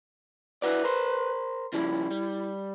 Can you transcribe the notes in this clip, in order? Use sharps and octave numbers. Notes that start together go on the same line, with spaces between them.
E4 F#4 B4 D5
A#4 C5
C#3 F3 G3 E4
G3